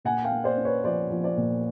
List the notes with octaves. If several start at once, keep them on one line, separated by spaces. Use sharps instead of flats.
A#2 F#5 G#5
F5 G5
A#3
C5 D5
C#4
B4 C#5
F3 C5 D5
F3
C5 D5
A#2